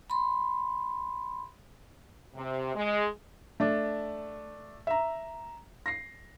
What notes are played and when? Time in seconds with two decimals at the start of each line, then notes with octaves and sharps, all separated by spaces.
0.10 B5 C6
2.35 C3
2.75 G#3
3.60 A3 D4
4.87 E5 A#5
5.86 A#6 C7